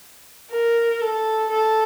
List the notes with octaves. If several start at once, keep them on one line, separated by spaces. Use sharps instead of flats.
A#4
A4
A4